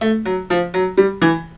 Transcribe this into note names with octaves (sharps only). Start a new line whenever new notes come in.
A3
F#3
F3
F#3
G3
E3